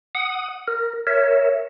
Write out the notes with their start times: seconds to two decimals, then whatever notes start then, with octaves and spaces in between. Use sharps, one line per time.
0.15 F#5 D#6
0.68 A#4
1.07 A#4 C#5 E5